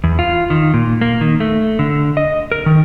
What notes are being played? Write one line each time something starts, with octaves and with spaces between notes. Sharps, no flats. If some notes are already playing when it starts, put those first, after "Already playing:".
E2
F4
D#3
A#2
A#3
D#3
A3
D3
D#5
A#4
D#3